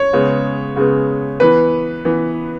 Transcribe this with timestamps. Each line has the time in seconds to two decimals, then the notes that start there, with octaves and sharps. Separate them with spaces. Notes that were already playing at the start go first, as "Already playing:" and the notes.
Already playing: C#5
0.13 C#3 G#3 B3
0.76 C#3 G#3 B3
1.40 E3 B3 B4
2.05 E3 B3